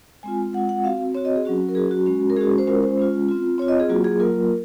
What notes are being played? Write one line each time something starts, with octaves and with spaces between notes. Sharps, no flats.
G#3 C4 F4 G#5
G#3 C4 F4 F#5
F#5
C4 F#4 F5
C4 F#4 C#5
D#5
G#4
F#3 C#4 F#4
A#4
F#3 C#4 F#4 G#4
F#4
G#3 C#4 F#4
A#4
G#3 C#4 F#4 G#4
C5
G#3 C#4 F4 A#4
C5
G#3 C#4 F4
C4 F4
C4 F4 C#5
D#5
G#4
F#3 A#3 F4 F#4
G#4
F#3 A#3 F4 A#4